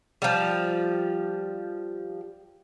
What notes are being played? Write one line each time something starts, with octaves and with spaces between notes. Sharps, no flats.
F3 G3